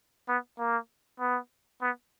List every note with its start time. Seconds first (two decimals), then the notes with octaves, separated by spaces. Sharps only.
0.28 B3
0.59 A#3
1.20 B3
1.81 B3